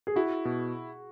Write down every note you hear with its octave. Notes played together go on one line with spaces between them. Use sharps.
G#4
E4 F#4
B2